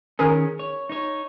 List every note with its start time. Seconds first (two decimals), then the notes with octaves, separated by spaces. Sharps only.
0.19 D#3 C#4 G#4 A#4
0.59 C#5
0.89 D#4 C#5